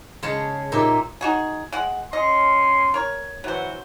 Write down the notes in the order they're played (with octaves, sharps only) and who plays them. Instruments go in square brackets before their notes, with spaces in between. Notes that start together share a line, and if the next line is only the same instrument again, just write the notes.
[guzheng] C#3 G#3 C#5 A5
A#2 D#4 G4 E5
[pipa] D#4 F#4 G#4
G#3 F#5
[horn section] C#4 C6 [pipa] D#5
[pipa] A#4 C#5
[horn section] E3 F#4 [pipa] F#3 C5